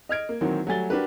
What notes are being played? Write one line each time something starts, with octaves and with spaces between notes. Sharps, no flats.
D#5 F6 G#6 D7
A#3
D#3 E3 F#3 A#3 C4
F#3 G3 A3 G#5 A6 G7
D4 F#4 G4 A#4 B4